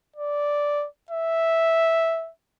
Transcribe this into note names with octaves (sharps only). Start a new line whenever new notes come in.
D5
E5